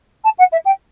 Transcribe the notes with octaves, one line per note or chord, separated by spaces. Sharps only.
A5
F#5
E5
G5